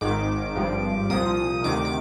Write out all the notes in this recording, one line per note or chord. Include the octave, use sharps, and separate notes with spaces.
G#1 G#2 D#3 D6
G#1 G2 F3
C2 A#2 F3 D#6
D2 C3 D#3 D6
D6